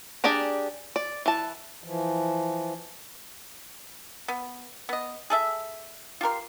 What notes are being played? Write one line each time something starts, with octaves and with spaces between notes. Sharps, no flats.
D4 G4 G#4 D5 A#5
D5
E3 A5
E3 F3
B3
B3 D#5
G#4 A4 E5
F4 G4 A#4 C6